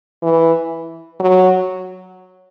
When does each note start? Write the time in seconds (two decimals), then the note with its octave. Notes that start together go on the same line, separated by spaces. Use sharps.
0.22 E3
1.20 F#3